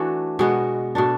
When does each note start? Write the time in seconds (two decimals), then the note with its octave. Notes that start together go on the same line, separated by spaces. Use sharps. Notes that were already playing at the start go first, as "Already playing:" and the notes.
Already playing: E3 A3 D4 F#4
0.39 B2 G#3 B3 F#4
0.95 B2 A3 D4